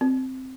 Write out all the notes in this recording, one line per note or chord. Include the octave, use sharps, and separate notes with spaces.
C4